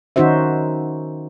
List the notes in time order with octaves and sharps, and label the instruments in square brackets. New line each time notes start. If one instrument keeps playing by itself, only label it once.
[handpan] D#3 C#4 D#4 F#4 C5 E5